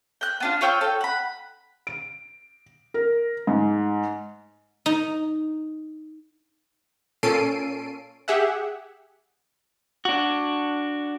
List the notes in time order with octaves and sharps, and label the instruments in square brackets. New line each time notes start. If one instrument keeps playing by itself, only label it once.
[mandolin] G5 F#6
B3 D4 F4
F4 C#5 G5 E6
A4 G5
F#5 B5
[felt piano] D7
A#4
G#2
[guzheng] D#4
[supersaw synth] A#2 C#4 A4 C7 D7 D#7
G4 G#4 E5 F#5
[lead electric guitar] D4 F#4